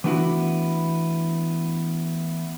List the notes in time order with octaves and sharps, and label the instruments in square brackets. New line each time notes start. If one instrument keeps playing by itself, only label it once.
[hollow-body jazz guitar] E3 A3 B3 D4 E4 F#4